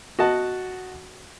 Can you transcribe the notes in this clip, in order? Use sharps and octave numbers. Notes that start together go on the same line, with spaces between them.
F#4 D#5 F#5 A5